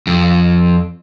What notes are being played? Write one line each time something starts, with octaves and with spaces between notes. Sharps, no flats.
F2